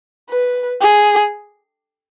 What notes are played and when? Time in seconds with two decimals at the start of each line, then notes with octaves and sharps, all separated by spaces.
0.29 B4
0.81 G#4